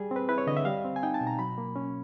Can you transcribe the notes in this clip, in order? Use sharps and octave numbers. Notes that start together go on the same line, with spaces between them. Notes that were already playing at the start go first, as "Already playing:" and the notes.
Already playing: G3 G#4
C4 B4
E4 B4
C#5
D3 D#5
E5
G3 F5
C4
G#5
D#4 G5
A5
B2
A#5
F#3 B5
A#3
C#4